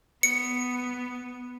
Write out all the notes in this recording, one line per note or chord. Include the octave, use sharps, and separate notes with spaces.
B3 C#7